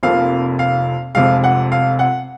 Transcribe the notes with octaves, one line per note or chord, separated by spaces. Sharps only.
F1 F2 C3 F3 A#3 F5
F5
F1 F2 C3 F3 G#3 F5
F#5
F5
F#5